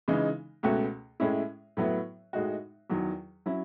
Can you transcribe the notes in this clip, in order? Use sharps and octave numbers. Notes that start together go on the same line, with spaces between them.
C#3 E3 G#3 D#4
C#2 B2 A3 C#4 F#4
A2 G#3 C#4 E4
A2 F#3 B3 E4
A2 G#3 D#4 F#4
E2 D#3 F#3
F#3 C#4 E4